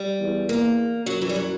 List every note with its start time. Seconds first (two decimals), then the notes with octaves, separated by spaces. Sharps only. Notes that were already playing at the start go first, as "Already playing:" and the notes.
Already playing: G3
0.21 E2
0.49 A#3
1.06 F#2 F#3
1.21 E3
1.29 G3
1.36 F#3